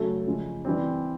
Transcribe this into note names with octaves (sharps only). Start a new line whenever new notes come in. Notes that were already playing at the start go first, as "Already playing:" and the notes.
Already playing: C#3 F#3 A3
C#3 F3 G#3
E3 G3 C4